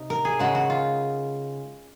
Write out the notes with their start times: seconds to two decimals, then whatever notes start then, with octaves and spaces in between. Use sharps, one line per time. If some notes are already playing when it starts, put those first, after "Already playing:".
Already playing: C3 D#4
0.10 A#4
0.25 G#4
0.39 C#3 G#3 F#4
0.55 F#4
0.70 F4